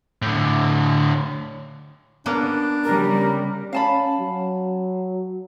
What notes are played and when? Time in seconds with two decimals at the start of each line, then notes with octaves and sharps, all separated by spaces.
0.22 A2 D3
2.26 A#3 B3 C#4 D4
2.84 C#3 G3 A#4
3.73 C#4 F5 A5 B5
4.20 F#3